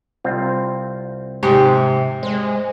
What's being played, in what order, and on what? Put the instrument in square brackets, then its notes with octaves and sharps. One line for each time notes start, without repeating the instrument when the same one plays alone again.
[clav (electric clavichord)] C2 C4 F4
[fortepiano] G#2 [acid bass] C3 [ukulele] G4
[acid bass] G#3 [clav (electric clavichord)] C5